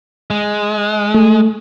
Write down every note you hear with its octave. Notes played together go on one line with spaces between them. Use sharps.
G#3
A3